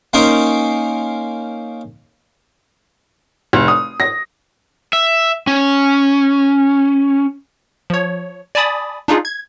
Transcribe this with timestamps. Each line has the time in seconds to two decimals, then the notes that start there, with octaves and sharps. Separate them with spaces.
0.13 A#3 C#4 D#4 A#4 C5
3.53 F1
3.68 D#6
4.00 A#6
4.93 E5
5.47 C#4
7.90 F3 C#5
8.55 D5 G#5 A5 B5 D#6 A6
9.08 D4 D#4 F4 G#4
9.25 G#6